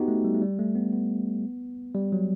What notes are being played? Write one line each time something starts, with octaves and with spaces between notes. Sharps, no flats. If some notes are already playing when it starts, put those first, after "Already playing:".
Already playing: B3 D#4 F#4 G4
A3
G3
A3
G3
A3
B3
B3
G3
F#3